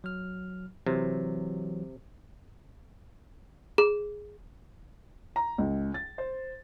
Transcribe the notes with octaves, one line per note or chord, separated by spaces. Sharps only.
F#3 F6
C3 E3 F#3
G#4
A#5
C#2
A6
C5